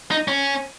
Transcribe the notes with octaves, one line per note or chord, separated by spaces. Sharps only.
D#4
C#4